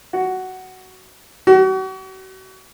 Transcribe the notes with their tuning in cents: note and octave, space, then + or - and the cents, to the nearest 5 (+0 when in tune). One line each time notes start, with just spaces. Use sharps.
F#4 +10
F#4 +40